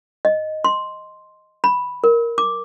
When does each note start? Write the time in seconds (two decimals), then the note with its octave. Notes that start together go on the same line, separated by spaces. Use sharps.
0.25 D#5
0.64 C6
1.64 B5
2.04 A#4
2.38 D6